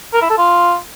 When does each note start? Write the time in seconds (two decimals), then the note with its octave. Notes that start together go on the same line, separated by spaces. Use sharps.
0.14 A#4
0.22 E4
0.30 A4
0.38 F4